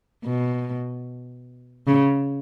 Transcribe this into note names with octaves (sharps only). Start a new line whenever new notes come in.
B2
C#3